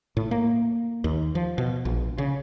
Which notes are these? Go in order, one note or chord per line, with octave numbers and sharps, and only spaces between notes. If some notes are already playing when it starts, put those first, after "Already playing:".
A2
A#3
D#2
F3
B2
A#1
C#3